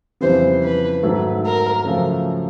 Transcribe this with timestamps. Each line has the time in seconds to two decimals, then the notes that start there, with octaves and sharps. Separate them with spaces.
0.21 F2 C#3 E3 G3 B3 C5
0.62 B4
1.03 G#2 D#3 F#3 A3
1.44 A#4
1.85 F#2 C#3 F3 A3 C#4